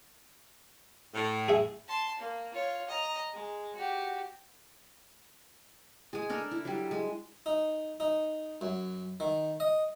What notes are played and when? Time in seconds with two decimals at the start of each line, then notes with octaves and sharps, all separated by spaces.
1.14 A2
1.48 G#4 E5
1.88 A5 C6
2.19 A#3
2.54 F4 C#5
2.89 D#5 A#5
3.33 G#3
3.76 F#4 G4
6.13 G#3 G#4
6.29 D4 A4 A#4
6.51 E4
6.65 F#3 G3
6.91 G#3
7.46 D#4
8.00 D#4
8.61 F#2
9.20 D#3
9.60 D#5